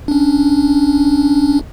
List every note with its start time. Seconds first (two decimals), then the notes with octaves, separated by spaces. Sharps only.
0.08 C#4 D4